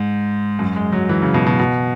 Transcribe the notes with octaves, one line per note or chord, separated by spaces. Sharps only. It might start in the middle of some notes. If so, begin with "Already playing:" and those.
Already playing: G#2
F#2
G#3
F#3
E3
C#3
B2
B2
B2